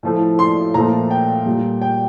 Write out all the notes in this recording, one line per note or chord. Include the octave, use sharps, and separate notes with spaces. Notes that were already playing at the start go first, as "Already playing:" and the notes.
A2 F3 A3
C6
A#2 F3 A3 A#5
G5
A#2 G3
G5